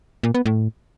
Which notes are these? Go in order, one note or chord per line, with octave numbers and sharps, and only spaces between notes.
A#2
B3
A2